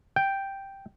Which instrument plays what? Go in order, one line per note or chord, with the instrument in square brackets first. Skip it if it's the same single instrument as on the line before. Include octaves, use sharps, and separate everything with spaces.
[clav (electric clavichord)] G5